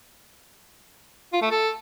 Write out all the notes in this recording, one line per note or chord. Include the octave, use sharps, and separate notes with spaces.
F4
A3
A4